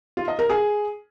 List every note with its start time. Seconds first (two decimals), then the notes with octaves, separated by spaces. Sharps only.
0.17 F4
0.28 D#5
0.39 A#4
0.50 G#4